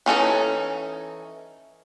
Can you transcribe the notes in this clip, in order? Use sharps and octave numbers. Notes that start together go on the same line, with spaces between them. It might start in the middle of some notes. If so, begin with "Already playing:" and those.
E3 C#4 D#4 A4